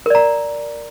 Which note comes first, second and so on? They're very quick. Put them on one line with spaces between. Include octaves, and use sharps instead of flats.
A#4 D5 A#5